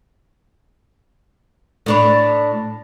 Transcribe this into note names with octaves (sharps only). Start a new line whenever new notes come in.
A2 D4 C#5